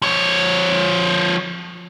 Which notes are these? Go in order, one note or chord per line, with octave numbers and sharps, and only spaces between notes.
F3 C#5